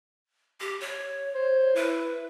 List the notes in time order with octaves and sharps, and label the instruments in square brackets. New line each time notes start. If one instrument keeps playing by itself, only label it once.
[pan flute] G4
C#5
[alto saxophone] C5
[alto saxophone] E4 [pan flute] B4